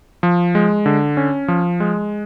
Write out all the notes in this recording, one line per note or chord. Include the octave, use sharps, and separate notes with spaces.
F3
G#3
D3
C#4
F3
G#3